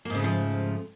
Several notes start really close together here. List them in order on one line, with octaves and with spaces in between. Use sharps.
A#3 G#2 C#3 A3 F3